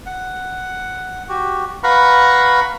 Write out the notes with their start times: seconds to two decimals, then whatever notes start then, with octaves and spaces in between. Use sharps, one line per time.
0.06 F#5
1.29 F#4 G4
1.83 B4 F5 F#5 A#5 B5 C#6